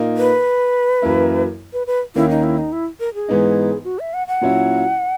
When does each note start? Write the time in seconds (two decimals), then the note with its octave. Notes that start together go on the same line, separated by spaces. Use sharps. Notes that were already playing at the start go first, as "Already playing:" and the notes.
Already playing: A#2 A#3 D#4
0.17 B4
1.02 F#2 E3 A#3 E4
1.73 B4
1.87 B4
2.15 D#2 D#3 A#3 C#4 E4
2.30 D#4
2.44 E4
2.58 D#4
2.72 E4
3.00 A#4
3.14 G#4
3.28 G#2 E3 B3 D#4
3.84 F#4
3.99 E5
4.14 F#5
4.28 F#5
4.41 A#2 F#3 C#4 E4